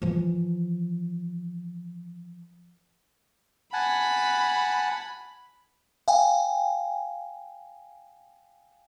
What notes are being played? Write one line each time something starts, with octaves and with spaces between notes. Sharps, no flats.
E3 F3
F#5 G#5 A5 B5
F5 G5 G#5